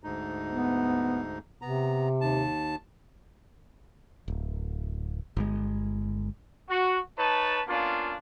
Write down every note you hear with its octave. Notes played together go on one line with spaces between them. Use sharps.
D2 G#2 D#4
B3
C3 B3 A#5
D#2 A5
D1
G1 G#3
F#4
D#4 B4 C#5 A5
A#3 B3 C#4 D4 F4